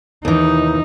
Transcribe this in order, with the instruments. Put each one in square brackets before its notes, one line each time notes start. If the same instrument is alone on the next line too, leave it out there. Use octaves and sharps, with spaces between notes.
[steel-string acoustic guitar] D#2 E3 [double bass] D#4